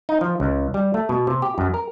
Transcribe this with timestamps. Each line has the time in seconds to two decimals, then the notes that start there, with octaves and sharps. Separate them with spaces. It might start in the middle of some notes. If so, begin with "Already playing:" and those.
0.09 D#4
0.21 F3
0.40 C#2
0.74 G3
0.94 A3
1.09 B2
1.27 C3
1.42 G4
1.58 F#2
1.74 A#4